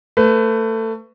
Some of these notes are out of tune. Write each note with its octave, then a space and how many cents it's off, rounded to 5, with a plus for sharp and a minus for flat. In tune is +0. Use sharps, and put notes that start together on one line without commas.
A3 +25 B4 +25